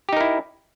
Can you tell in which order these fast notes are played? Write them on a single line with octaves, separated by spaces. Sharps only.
G4 D#4 A#4 E4